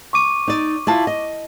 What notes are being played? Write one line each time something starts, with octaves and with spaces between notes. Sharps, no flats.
C#6 D6 D#7
D#4 D5
E4 F4 A5
D#5